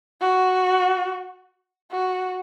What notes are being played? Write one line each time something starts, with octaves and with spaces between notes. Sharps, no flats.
F#4
F#4